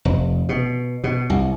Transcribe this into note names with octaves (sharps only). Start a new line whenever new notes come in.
F1
B2
B2
C2